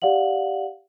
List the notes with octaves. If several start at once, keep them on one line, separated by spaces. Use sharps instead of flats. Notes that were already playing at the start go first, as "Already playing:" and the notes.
G4 D5 F5 F#5 F#7